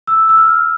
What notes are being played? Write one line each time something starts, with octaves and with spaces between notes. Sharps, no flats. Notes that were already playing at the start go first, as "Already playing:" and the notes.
E6
E6
F6